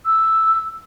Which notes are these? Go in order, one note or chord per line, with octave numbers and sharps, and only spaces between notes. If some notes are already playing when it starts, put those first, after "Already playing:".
E6